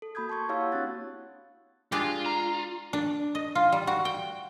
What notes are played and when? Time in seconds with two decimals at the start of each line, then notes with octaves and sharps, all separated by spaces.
0.02 A4
0.15 A#3 F#4 B5 D#6 G6 G#6
0.29 A5 C6 C#6 G#6
0.49 E4 G4 C#5 F5 C#6 E6
0.61 F#5
0.72 A#3 C4 D4 F#4 F#6 A6
1.92 G#3 D4 F4 G4
2.26 A#5
2.93 D4
3.35 D#5
3.55 F4
3.72 G3
3.87 F#4
4.05 G5